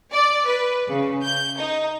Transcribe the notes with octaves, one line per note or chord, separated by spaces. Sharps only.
D5
B4
C#3
G6
D#4